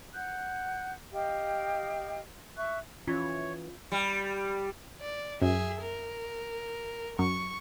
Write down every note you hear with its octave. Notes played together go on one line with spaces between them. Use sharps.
F#5 F#6 G6
G4 D#5 F5 G5
E5 C#6 F#6
E3 C#4 F4 C#5
G3
D5
F#2 G#4 E5
A#4
F#2 C#6